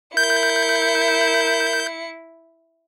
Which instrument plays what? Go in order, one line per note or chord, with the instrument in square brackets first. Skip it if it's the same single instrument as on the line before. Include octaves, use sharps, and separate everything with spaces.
[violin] E4 C#7 [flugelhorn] A#4 [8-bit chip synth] G6